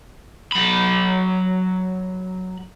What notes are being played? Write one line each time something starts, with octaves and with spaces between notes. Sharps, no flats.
F#3 B5